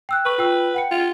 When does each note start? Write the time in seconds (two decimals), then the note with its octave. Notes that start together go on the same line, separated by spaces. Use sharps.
0.09 G5 E6 F#6
0.26 B4 C#6
0.38 F4 G5 E6
0.74 F#5 G5 C#7
0.92 F4